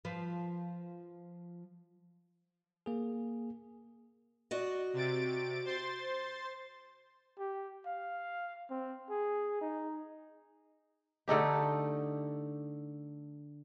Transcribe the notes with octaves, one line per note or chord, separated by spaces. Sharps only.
F3 B4
A#3 G#4
F#4 D5 D#5
C3 A6 D7
C5 C6 A6
G4
F5
C4
G#4
D#4
D3 A3 D#4 G4